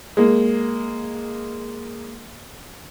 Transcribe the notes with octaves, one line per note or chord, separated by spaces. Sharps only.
G#3 A#3